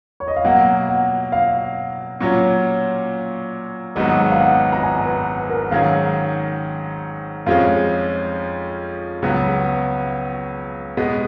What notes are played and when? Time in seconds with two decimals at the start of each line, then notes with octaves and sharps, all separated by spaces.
0.20 C#5
0.28 D#5
0.36 F5
0.44 B2 F#3 A#3 F#5
0.89 F#5
1.32 F5
2.21 A#2 F#3 C#4
3.96 G#1 G#2 F#3 B3 D#5
4.31 F5
4.40 F#5
4.72 A#5
4.83 G#5
5.05 B4
5.49 A#4
5.71 G#2 D#3 F#3 C#4 G#4 F5
7.46 F2 F3 G#3 C#4 F5
9.22 C#2 C#3 F#3 B3
10.97 B2 G#3 B3 D#5